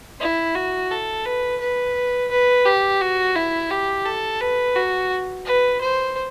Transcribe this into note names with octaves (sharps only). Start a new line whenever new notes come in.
E4
F#4
A4
B4
B4
B4
G4
F#4
E4
G4
A4
B4
F#4
B4
C5